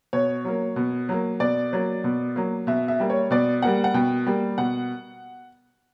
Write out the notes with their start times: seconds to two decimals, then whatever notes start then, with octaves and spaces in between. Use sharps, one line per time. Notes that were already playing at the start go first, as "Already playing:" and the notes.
0.13 B2 C#5
0.45 F#3 A#3
0.76 B2
1.09 F#3 A#3
1.40 B2 D5
1.73 F#3 A#3
2.04 B2
2.36 F#3 A#3
2.67 B2 E5
2.88 E5
3.00 G3 A#3
3.10 C#5
3.31 B2 D5
3.62 G3 A#3 F#5
3.84 F#5
3.94 B2 G5
4.27 G3 A#3
4.58 B2 F#5